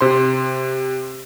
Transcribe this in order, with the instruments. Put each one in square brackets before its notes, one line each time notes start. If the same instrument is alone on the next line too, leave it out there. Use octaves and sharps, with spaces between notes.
[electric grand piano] C3 C5 C6